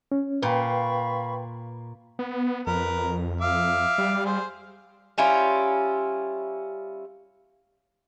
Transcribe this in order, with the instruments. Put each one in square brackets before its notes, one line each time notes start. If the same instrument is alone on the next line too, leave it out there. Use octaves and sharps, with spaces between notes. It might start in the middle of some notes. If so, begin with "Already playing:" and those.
[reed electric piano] C#4
[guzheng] A#2 [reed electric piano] B4 G5 [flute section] F5 B5 C#6
[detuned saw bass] B3
[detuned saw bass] F2 [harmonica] A#4 B4
[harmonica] E5 F5 D6
[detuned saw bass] G3
[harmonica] G#4 C5
[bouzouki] G3 C#4 E4 F4